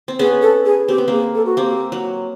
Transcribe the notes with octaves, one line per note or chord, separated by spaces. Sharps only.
C4
B3 C#4 G#4
A4
G#4
C4 G4
B3
A#3 C4 G#4
A4
F#4
A#3 C4 G4
F#3